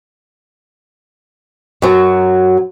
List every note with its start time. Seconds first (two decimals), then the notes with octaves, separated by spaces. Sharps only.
1.82 F#2 F#3